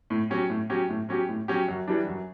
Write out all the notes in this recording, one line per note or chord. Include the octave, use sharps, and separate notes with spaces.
A2
F#3 C#4 G4
A2
F#3 C#4 G4
A2
F#3 C#4 G4
A2
F#3 C#4 G4
F#2
E3 G3 D4
F#2